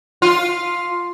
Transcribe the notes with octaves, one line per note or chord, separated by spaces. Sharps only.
F4